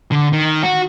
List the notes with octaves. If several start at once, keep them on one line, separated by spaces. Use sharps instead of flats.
D3
D#3
F#4